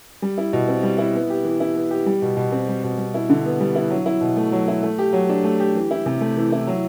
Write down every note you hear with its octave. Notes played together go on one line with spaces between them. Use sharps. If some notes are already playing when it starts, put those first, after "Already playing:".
G3
E4
B2
C4
G3
E4
B3
G4
E3
E4
B3
G4
G3
B2
B2
C4
G3
B2
G3
E4
D3
B3
G3
E4
F#3
E4
B2
A3
F#3
E4
A3
G4
F#3
D4
A3
G4
E3
E4
C3
A3
E3
E4
F#3